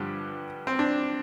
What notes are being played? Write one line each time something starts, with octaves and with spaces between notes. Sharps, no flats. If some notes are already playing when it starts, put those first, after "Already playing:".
Already playing: G2 D3 F3 G4
C4
D4